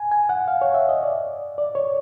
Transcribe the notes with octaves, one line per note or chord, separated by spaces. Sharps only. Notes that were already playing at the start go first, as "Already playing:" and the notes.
Already playing: G#5
G#5
F#5
F5
C#5
E5
D#5
D5
D5
C#5